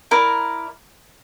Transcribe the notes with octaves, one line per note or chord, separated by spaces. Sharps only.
E4 A#4 D5